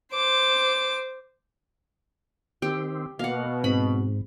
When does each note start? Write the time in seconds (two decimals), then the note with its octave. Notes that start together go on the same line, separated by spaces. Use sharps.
0.13 C5 D6
2.62 D#3 C4 G4
3.19 B2 A#3 F5 F#5
3.64 G#2 C4 B5